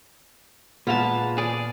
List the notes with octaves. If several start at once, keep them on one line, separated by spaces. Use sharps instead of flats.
A#2 G#3 B3 F4 A5 F7
G#4 D5